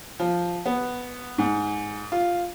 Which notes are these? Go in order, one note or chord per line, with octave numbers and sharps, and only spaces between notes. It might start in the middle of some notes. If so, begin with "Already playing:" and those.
F3
B3
G#2
F4